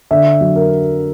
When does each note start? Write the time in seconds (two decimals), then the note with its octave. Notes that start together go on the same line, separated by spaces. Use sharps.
0.11 D3 E5
0.41 F#3
0.56 A#4